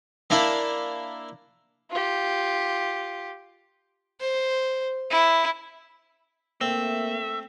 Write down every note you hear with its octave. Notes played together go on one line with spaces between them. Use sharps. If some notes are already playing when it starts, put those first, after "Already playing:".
A#3 D4 E4 B5
F4 G4
C5
E4
A3 A#3 C4 E5